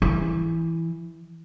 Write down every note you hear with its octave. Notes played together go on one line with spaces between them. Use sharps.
E3